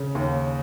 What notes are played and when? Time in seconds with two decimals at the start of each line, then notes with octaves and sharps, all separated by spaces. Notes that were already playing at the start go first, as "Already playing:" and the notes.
Already playing: C#3
0.15 D#2